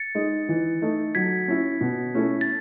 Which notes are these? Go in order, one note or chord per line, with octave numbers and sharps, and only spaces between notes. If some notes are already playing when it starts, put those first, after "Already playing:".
Already playing: A6 C#7
G#3 D#4
E3
A3 D#4
F#3 G#6 B6
C#4 E4
B2
A3 C#4 E4
A6